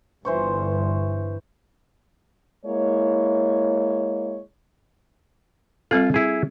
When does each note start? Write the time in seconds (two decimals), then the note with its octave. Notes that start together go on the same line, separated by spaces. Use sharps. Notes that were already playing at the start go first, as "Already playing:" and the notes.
0.25 G1 G2 E3 C5 C#6
2.65 G#3 A#3 E4 C#5
5.91 G3 C4 F4 A4
6.14 E4 G#4